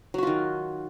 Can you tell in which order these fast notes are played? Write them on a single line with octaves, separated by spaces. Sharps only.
F#3 F#4 F4 D#3